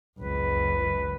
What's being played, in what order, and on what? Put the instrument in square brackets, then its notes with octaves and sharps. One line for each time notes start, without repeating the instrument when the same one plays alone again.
[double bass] F#1 C#2 [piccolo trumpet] B4